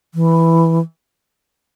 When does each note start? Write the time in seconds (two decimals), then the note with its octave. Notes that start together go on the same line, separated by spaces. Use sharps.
0.15 E3